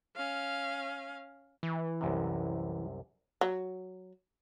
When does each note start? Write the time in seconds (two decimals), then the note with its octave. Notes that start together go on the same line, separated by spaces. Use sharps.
0.16 C#4 F5
1.63 E3
2.01 C2 F#2 C3
3.41 F#3